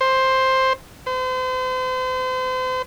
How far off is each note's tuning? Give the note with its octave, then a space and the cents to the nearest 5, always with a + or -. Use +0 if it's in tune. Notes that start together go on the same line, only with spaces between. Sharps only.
C5 +5
C5 -40